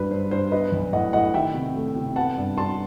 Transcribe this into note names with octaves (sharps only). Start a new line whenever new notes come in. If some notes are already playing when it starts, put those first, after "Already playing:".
Already playing: G2 F#3 B4
G2 C5
G2 C5
B3 B4 D#5
B1
A2 D#5 F#5
A2 D#5 F#5
D#3 E5 G5
C3
A3
C3
B3 F#5 A5
G2
G2 A5 C6